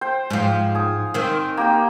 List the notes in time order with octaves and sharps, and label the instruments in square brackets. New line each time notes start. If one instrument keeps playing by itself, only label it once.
[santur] C5 G5
[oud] G#2 F3 [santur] F5 G5
[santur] G#5 D#6
[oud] D#3 C4
[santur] A#3 G4 G5